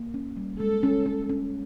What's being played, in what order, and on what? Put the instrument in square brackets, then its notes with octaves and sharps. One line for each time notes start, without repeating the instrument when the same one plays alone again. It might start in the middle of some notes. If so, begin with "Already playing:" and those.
Already playing: [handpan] A#3
C#4
G3
[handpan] G#3 [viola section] A4
[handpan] C#4
C#4
C#4